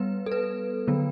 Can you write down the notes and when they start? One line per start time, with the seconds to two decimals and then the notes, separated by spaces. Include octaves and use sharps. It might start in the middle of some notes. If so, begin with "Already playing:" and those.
Already playing: G3 B3 B4
0.26 A4
0.32 B4
0.87 D3 F#3 B3